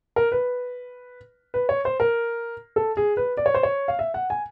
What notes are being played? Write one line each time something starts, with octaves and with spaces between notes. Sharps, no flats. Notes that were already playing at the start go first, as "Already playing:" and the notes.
A#4
B4
B4
C#5
C5
A#4
A4
G#4
B4
D5
C#5
C5
C#5
F5
E5
F#5
G#5